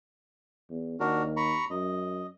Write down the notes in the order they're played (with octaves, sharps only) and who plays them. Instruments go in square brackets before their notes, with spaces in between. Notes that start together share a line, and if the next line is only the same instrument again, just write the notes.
[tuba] E2
[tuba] D#2 [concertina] D4 F#4 A#4
[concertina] A#5 B5 C#6
[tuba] F#2 [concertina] D#5